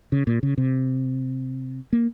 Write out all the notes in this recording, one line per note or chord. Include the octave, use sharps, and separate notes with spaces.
C#3
A#2
C#3
C3
A#3